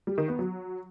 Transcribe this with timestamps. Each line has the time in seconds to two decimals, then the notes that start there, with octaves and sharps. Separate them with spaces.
0.07 G3
0.18 D#3
0.28 B3
0.39 F#3